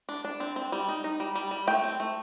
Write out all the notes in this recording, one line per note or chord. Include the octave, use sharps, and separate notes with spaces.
D4
D4
C4
C4
G3
D#4
D#4
G3
G3
G3
A3 G5
C4
A3